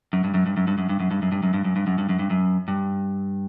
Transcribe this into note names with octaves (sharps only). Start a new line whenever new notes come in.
F#2
G2
F#2
G2
F#2
G2
F#2
G2
F#2
G2
F#2
G2
F#2
G2
F#2
G2
F#2
G2
F#2
G2
F#2
G2